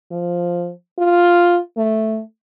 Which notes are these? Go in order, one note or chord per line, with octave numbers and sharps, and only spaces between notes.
F3
F4
A3